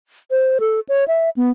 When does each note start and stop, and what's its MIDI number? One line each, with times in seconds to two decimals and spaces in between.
0.31 0.58 72
0.60 0.80 69
0.89 1.04 73
1.08 1.30 76
1.37 1.51 59